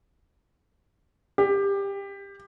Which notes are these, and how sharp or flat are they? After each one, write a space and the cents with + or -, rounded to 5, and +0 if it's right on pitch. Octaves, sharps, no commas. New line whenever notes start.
G4 +20